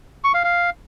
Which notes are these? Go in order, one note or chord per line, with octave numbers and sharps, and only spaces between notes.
C#6
F5
F5